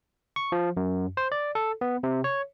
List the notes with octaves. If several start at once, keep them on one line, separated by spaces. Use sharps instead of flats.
C#6
F3
F#2
C5
D5
A4
B3
C3
C#5